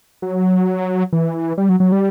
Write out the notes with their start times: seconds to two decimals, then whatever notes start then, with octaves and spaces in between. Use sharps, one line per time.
0.22 F#3
1.13 E3
1.58 G3
1.69 F#3
1.80 F#3
1.92 G3